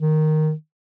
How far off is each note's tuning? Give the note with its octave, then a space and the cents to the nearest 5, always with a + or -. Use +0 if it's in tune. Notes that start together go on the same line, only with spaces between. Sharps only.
D#3 -5